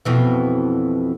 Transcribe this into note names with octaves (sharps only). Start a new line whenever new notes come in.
F2 B2 E3